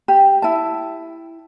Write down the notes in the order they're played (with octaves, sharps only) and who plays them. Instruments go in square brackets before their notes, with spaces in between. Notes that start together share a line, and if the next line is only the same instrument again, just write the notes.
[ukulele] G4
E4 A5